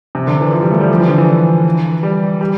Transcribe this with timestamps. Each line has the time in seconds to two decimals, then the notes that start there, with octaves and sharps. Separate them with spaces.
0.15 C3
0.27 D3
0.41 E3
0.52 F3
0.62 G3
0.72 A3
0.80 G3
0.90 F3
1.00 E3
1.09 D3
1.18 E3
2.03 G3
2.41 G3